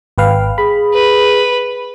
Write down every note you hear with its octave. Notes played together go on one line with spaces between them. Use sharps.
G#1 B4 F5 G5
G#4 B5
B4